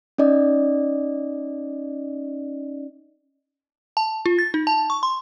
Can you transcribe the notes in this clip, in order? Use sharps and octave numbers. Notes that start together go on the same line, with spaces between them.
C#4 D#4 D5 D#5
A5
F4
A6
D#4
A5
C#6
C6